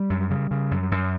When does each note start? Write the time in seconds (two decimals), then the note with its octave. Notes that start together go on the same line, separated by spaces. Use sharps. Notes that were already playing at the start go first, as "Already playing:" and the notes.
Already playing: G3
0.10 F#2
0.30 C#3
0.51 C#3
0.71 F#2
0.92 F#2